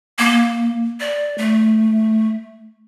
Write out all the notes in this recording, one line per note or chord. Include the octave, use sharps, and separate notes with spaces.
A#3
D5
A3